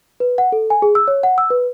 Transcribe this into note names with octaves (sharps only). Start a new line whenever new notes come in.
B4
F#5
A4
G#5
G#4
E6
C#5
F#5
E6
B4